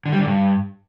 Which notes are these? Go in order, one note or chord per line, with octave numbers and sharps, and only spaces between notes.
D3
G3
D3
G2